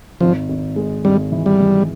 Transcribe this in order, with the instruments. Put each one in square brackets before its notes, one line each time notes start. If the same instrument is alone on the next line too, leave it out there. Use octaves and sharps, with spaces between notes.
[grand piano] G#1 [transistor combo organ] F3
[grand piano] G#1
G#3
[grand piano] G#1 [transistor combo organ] G3
[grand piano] E3
[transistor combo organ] G3
[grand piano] E3